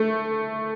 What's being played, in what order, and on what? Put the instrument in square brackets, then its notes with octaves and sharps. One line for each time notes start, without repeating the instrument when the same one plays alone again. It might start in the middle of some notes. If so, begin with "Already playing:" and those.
Already playing: [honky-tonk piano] A3